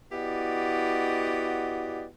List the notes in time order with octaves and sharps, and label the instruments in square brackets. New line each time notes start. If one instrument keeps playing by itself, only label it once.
[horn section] B3 E4 F#4 G4 D5 D#5